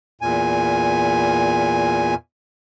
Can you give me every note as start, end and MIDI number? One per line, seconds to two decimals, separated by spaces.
0.21 2.15 40
0.21 2.15 46
0.21 2.15 80